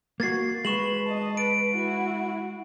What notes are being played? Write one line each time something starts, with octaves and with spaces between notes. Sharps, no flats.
A#3 F#4 G#6 A6 C7
G#3 B4 C#6 E7 F#7
D#5 A5
B4 D7
E4 F#4